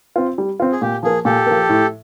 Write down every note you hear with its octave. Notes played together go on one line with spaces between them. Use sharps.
C4 F4
G3
C4 F4
G#4
A#2 G4
F3 A#3 G#4
A#2 G4 A4
F3 A#3
A2